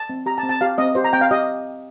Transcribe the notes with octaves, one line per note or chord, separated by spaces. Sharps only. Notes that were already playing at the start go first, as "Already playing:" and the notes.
Already playing: A5
C4
G4 A#5
A5
C4
A5
G4 F5
C4 D#5
G4 C5
A#5
C4 G5
F5
G4 D#5